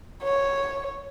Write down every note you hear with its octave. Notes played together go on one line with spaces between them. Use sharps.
C#5